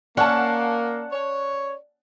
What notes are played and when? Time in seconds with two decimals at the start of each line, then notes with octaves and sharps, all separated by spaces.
0.17 A#3 C#4 D5 F#5 A5
1.12 C#5